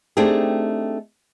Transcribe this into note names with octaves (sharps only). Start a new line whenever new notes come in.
A3 C4 D4 D#4 G4 G#4